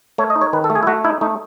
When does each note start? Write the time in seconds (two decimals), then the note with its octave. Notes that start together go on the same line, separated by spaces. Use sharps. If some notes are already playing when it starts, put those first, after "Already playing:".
0.18 A3 C#5
0.30 D#5
0.36 D#4
0.41 C#5
0.53 D#3 B4
0.64 A4
0.70 A3
0.75 G#4
0.83 E4
0.87 A3 F#4
1.04 D#4 E4
1.21 A3 D#4